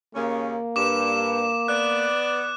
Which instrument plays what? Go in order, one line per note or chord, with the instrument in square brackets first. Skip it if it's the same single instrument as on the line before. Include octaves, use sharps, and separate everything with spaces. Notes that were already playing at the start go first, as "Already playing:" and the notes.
[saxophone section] D#2 C#3 C#4 [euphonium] A#3
[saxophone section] G2 [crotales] D6 E7
[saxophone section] B3 D5 [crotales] F#6